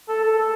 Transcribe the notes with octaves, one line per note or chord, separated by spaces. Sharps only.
A4
A4
A4